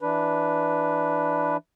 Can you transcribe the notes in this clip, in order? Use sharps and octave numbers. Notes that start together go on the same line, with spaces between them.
E3 D4 B4